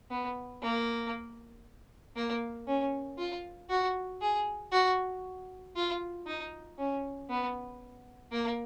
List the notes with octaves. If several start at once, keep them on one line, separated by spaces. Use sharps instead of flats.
B3
A#3
A#3
C#4
F4
F#4
G#4
F#4
F4
D#4
C#4
B3
A#3